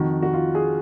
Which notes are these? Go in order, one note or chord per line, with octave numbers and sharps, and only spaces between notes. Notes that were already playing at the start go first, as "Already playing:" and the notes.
Already playing: F2 D#3 F#4
F#4
F4
G#4